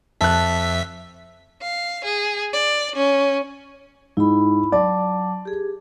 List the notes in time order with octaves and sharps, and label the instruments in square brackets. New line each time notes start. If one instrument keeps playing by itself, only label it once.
[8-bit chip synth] F2 E5 B6 [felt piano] A5 F#6
[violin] F5
G#4
D5
C#4
[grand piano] G#2 [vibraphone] E4 B5
[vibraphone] F#3 A5 D6 [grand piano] D5
[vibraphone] G4 G#4